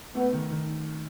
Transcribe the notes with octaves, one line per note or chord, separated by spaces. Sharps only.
A3 B3
D#3
D#3